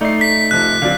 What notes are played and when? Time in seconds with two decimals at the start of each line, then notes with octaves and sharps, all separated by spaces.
0.01 A3 D#4 D5 C7
0.21 B6
0.51 C3 F3 F#6
0.82 D3 F#3 C4 D5 F5